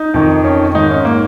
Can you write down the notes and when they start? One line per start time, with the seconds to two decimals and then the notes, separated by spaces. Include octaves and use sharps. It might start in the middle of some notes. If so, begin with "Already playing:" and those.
Already playing: D#4
0.14 F2 D#3
0.44 C#4
0.74 G#2 D#3 D#4
0.91 C#4
1.05 A#3